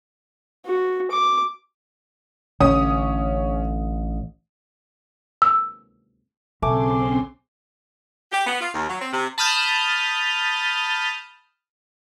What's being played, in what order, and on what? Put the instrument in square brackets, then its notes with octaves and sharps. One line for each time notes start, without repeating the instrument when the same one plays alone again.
[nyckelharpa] F#4
D6
[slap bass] A1 D3 [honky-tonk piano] C#4 D#6
[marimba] E6
[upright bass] B1 [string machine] C#3 C4 C6 [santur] A3 G#5 D6
[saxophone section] G4
B3
F4
D#2
F#3
C4
C3
[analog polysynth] A5 B5 D#6 F6 G6